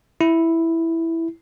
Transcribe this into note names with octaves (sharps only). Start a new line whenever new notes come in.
E4